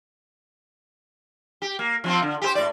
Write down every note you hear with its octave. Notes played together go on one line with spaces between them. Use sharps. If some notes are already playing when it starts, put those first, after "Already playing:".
G4
A#3
F3 C4 F4
D3
G4 G#4 C5
A2 D5